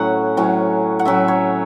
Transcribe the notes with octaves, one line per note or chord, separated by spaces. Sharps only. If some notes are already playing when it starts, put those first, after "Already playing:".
Already playing: A2 F#3 C#4 F#5
A2 F#3 C#4
F#5
A2 F#3 C#4 E5
C#5